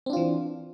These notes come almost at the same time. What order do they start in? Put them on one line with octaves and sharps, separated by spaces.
C4 D4 F4 E3